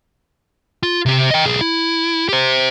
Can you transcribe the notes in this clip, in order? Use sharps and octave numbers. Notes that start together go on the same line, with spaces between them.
F4
C3 G4
D#5 G5
B1 G#4
E4
G4 C5